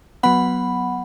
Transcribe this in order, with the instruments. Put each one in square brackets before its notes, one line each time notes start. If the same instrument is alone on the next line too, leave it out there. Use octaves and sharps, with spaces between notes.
[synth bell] F#3 B3 F#5 B5